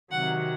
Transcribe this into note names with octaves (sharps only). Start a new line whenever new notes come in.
C3 D#3 F#3 F#5